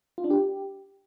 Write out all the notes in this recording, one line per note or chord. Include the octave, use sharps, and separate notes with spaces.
F4
D4
G4